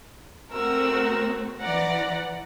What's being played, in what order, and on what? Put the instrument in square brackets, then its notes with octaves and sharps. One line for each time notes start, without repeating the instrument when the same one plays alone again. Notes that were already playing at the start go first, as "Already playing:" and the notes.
[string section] A3 C4 F#4 [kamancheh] A#4 E6
[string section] E3 D5 A#5 [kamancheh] F#5